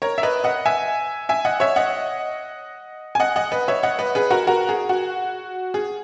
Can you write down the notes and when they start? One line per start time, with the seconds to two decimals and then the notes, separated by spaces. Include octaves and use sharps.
0.02 A#4 C#5
0.18 E5
0.23 B4 D#5
0.44 D#5 F#5
0.66 E5 G#5
1.29 E5 G#5
1.45 D#5 F#5
1.60 C#5 E5
1.76 D#5 F#5
3.15 G#5
3.20 D#5 F#5
3.36 D#5 F#5
3.52 B4 D#5
3.68 C#5 E5
3.83 D#5 F#5
3.99 B4 D#5
4.15 G#4 B4
4.31 F#4 A#4
4.47 F#4 A#4
4.69 G#4
4.89 F#4
5.74 G#4